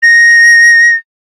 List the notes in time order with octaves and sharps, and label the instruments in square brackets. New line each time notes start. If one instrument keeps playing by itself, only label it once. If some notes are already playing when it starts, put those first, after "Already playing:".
[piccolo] A#6